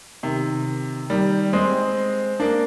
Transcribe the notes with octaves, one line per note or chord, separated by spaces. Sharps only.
C3 D#3
D#3 G3
G#3 C4
A#3 D4